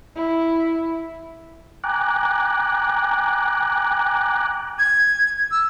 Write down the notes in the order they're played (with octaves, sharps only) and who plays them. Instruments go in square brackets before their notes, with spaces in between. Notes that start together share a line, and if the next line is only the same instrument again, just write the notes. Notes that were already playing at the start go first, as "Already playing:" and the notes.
[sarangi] E4
[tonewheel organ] G5 G#5 A#5 D6 F#6
[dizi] G#6
E6